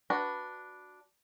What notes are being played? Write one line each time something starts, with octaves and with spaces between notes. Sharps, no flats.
D4 F#4 B4